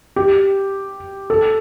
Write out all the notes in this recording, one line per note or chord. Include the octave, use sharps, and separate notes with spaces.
G4
A4